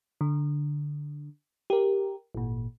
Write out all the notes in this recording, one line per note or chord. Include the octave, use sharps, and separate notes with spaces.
D3
G4 A#4
G#1 A#2